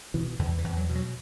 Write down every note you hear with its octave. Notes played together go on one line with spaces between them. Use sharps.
B2 E3
E2 D3
E3
E2
F#3
B2
F#3